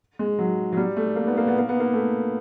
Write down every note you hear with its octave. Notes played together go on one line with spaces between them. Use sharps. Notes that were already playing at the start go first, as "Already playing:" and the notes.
G#3
F#3
F#3
G3
A3
A#3
B3
A#3
B3
A#3
B3
A#3
A3